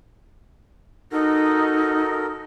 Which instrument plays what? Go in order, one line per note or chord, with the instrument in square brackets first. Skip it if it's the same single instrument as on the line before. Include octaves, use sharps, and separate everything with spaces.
[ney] D#4 [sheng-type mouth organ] F#4 A4 A#4